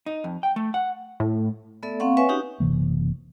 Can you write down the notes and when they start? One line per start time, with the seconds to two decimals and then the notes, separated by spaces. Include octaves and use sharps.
0.06 D#4
0.24 F2
0.43 G5
0.56 A3
0.74 F#5
1.20 A2
1.83 A3 B3 A4 D5 E5
2.00 A#3 C4 F5 F#5 C#6
2.17 B4 C#5 E5 F#5 G#5 C#6
2.29 C#4 D#4 F#4 G4
2.60 F#1 C3 E3 A#3